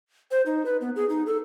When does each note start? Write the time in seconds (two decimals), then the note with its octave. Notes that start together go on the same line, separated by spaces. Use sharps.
0.31 C5
0.46 D#4
0.65 B4
0.81 B3
0.96 G#4
1.09 D#4
1.26 A4